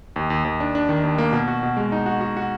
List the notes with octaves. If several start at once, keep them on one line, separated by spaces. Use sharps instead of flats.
D#2
D#2
D#2
D4
D4
D#3
D#2
A#3
B2
F#4
B2
G#3
D#4
F#4
F#4
F#4